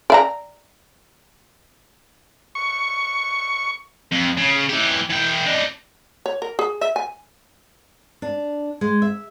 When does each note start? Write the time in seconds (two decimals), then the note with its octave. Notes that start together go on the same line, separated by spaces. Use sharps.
0.10 D5 E5 A#5
2.55 C#6
4.12 F2
4.37 C#3
4.69 E3 G4
5.09 E3 G5
5.46 D4 D#4
6.26 C#5
6.42 A#4
6.59 G#4
6.81 E5
6.96 G#5
8.22 D4
8.81 G#3
9.02 E5